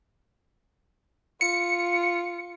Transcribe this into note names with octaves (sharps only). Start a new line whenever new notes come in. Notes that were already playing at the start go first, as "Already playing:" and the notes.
F4 C#7